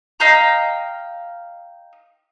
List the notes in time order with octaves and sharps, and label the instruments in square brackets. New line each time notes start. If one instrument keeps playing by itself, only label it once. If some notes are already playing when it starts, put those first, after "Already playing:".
[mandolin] D#5 F5 G5 A#5